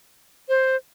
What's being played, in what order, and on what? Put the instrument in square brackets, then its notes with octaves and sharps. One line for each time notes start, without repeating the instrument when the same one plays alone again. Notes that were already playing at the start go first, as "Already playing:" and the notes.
[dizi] C5